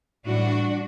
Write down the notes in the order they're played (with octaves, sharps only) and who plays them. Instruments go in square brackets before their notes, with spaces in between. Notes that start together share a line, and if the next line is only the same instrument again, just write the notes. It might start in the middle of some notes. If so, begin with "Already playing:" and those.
[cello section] A2 E3 G3 D4 F#4